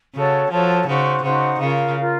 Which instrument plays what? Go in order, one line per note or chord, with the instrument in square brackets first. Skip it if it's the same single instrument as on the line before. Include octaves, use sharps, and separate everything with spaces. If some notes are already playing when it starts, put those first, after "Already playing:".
[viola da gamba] C#3 [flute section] F#4 A4 C#5 A5
[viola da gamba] F3 [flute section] F#4 A4 C#5 A5
[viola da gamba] C#3 [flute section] D#4 F#4 C5 F#5
[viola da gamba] C#3 [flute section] D#4 F#4 C5 F#5
[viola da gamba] C#3 [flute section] F4 A#4 F5
[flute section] F4 A#4 F5